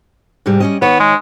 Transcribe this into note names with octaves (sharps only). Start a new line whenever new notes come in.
G#2 C3 G3
G3 C#4 D#5
D#3 B3 C#5
G#3